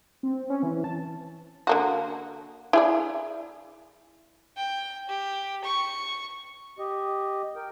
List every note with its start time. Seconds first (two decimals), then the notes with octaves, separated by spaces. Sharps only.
0.23 C4
0.50 C#4
0.63 E3
0.84 A5
1.67 D3 A#3 F#4
2.73 E4 G#4 D5
4.57 G5
5.09 G4
5.64 C#6
6.79 G4 D#5
7.56 A#4 G5